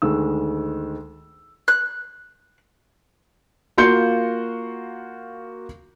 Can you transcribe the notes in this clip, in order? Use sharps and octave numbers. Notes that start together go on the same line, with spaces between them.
D2 D#3 G#3 E6
F#6
A#3 F4 F#4 C6 G6 C#7